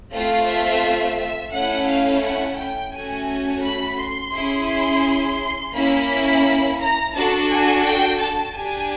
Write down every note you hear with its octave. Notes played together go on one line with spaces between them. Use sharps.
A3 C4 F4
E5
E5
A3 C#4 E4 F#5
F5
F#5
G5
A3 C#4 F#4 G#5
G#5
B5
C6
C#4 E4 G#4
C6
A#3 C#4 E4 B5
A#5
D4 F#4 A4 A5
G#5
G5
A5
D4 G4 G#5